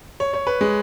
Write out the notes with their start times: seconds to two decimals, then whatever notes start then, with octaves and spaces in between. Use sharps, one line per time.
0.20 C#5
0.33 C#5
0.47 B4
0.61 G#3